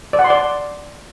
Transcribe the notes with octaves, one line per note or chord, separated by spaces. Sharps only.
D5
F#5
C6
D5